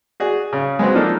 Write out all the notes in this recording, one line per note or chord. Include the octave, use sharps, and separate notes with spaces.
F#4 G#4 D5
C#3
G#3 B3 C4 F#4
F3 A#3 D4 D#4 A4 A#4